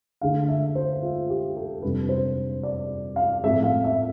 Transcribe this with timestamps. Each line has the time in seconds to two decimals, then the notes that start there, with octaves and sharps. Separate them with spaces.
0.21 D2 D3 A3 F5
0.49 E5
0.75 C5
1.02 F4
1.30 G4
1.57 A4
1.82 F2 C3 G3 D4 B4
2.09 C5
2.63 D5
3.16 F5
3.44 A2 F3 A3 C4 E5
3.64 F5
3.84 E5